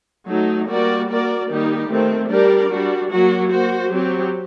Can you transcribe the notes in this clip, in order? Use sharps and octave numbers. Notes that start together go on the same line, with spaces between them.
F#3 A3 D#4
G3 A#3 F#4 A#4 D5
A#3 F#4 A#4 D5
D#3 G3 A#3 D#4 G4
D#3 A3 C4
G3 D4 G4 A#4 D5
G3 D4 F#4
F#3 A#3 F#4
A#3 F#4 C5
F#3 C4 G4